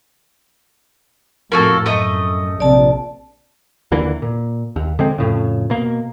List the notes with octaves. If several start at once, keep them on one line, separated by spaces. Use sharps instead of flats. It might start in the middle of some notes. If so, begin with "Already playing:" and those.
F2 A2 A#3 F#4 A4
F#2 A3 D#5 D#6
A#1 C3 D5 A5
D#2 D3 E3 A#3
A#2
D#2
D3 G#3 C4
F2 A2 C#3
B2 A#3